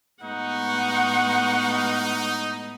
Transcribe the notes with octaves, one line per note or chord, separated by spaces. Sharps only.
A2 G#3 B3 D#4 F#5 C#6